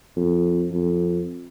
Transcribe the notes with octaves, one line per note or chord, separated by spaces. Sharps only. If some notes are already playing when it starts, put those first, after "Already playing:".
F2
F2